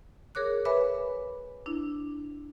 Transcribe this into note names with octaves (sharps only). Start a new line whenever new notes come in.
G#4 A#4 C#5 D6 F#6
B4 C#5 E5 G#5 B5 D6
D4 E4